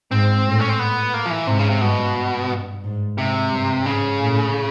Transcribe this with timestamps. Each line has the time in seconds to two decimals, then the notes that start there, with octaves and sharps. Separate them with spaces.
0.11 G#2 C4
0.46 A2
0.60 C#4
0.69 C4
0.79 B3
1.14 A#3
1.26 F3
1.30 E3
1.47 G#2 C3
1.59 C#3
1.70 C3
1.81 G2 B2
2.50 G2
2.84 G#2
3.18 G#2 C3
3.52 G2
3.86 G#2 C#3
4.20 A2